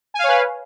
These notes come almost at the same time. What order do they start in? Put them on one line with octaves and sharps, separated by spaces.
G#5 F5 C#5 B4